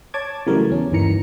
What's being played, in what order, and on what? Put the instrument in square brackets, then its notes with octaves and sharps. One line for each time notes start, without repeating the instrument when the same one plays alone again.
[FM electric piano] C#5 A5 D6 G#6
C#3 E3 F#3 G3 A3 A#4
E2 C#4
G1 D#2 D#3 E3 A#5 C#7